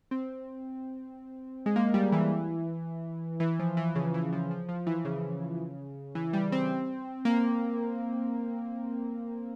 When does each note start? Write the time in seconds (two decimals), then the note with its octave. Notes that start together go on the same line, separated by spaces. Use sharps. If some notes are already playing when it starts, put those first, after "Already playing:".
0.11 C4
1.66 G#3
1.76 A#3
1.94 G3
2.12 E3
3.40 E3
3.59 F3
3.77 E3
3.95 C#3
4.14 E3
4.33 F3
4.51 F3
4.69 F3
4.86 E3
5.05 C#3
6.15 E3
6.33 G3
6.52 C4
7.25 A#3